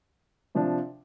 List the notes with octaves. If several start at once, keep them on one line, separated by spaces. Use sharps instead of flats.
C3 F3 D4